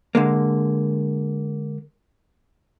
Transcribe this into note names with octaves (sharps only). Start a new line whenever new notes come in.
D3 G#3 A#3